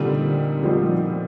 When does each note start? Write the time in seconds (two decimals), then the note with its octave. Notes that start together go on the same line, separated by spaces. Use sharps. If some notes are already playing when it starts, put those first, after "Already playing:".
Already playing: A#2 D3 G3 C4 D#4
0.62 A#2 F3 G3 C4 D#4